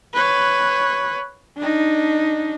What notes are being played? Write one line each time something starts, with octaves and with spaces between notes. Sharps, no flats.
B4 C#5
D4 D#4